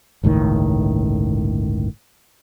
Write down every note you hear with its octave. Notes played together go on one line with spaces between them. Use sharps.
G1 C#2 A2 D#3